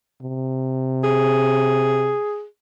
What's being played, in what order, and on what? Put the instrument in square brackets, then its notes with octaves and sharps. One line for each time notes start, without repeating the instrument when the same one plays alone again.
[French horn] C3
[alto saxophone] G#4